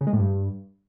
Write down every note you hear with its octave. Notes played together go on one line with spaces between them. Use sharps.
C#3
G#3
A2
G2